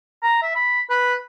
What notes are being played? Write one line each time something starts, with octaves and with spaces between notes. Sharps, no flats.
A#5
E5
B5
B4